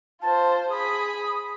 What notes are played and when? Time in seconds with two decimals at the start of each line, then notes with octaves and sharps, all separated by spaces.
0.22 F4 C5 A5
0.70 G#4 B5 D#6